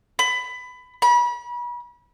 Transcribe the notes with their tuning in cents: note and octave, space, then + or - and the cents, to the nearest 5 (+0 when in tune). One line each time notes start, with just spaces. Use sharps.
B5 +20
B5 -35